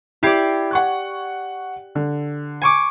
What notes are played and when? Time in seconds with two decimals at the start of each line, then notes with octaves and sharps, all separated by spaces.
0.23 E4 G4 D5 G#6 C7
0.71 F#5 C#6 F#6
1.95 D3
2.62 G#5 C#6 D6